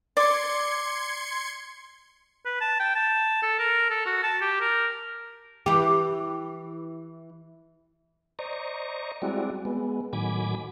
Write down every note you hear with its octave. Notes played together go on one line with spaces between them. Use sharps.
D5 C6 G#6 C#7
B4
A5
G5
A5
A4
A#4
A4
F#4
A5
G4
A#4
E3 G4
C5 D5 D#5 A#5 C#6
G3 G#3 C4 E4 F#4 D5
G#3 B3
A2 D#3 F#3 G#5 B5 D6